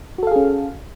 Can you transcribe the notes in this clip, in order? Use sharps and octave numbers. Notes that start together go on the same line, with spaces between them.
C#4 F#4 G#4 A4 F5